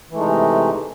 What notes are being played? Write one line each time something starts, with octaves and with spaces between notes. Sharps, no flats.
C3 E3 G#3 A3 D#4